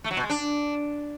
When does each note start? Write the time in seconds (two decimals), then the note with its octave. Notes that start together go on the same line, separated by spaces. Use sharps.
0.04 A3
0.11 F#3
0.17 B2
0.23 G#3
0.30 D4